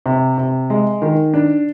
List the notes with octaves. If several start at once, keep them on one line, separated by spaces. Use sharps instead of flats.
C3
C3
G#3
D#3
D4